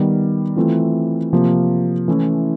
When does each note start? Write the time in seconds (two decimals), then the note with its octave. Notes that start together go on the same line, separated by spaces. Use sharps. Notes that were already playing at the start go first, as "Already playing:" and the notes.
Already playing: D#3 G3 B3
0.56 E3 A3 C4 F4
1.33 C3 F3 A#3
2.08 E3 A3 C#4 E4